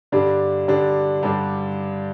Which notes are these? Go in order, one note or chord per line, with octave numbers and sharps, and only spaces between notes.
G2 D3 G3 D4
G2 D3 G3 D4
G2 D3 G3 D4